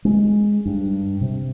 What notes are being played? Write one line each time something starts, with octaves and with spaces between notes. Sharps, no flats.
G#3
G2
C3